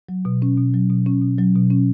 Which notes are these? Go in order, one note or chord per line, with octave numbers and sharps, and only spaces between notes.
F#3
B2
C#4
B2
F#3
B2
C#4
B2
F#3
B2
C#4